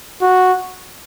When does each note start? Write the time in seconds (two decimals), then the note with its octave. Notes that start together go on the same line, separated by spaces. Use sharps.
0.22 F#4